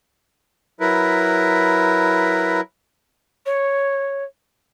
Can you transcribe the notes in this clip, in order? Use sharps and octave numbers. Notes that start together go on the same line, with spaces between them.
F#3 E4 A#4 B4
C#5